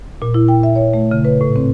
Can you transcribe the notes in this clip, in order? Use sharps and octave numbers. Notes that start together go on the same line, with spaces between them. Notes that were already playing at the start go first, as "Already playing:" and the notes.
A#2
E4
G5
E5
C#5
A3
C#3
B4
A2
C4